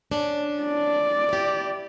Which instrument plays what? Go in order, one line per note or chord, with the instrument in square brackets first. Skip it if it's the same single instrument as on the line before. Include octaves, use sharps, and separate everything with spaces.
[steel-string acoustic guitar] C#4 D4
[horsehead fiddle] D5
[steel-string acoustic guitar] E4 G4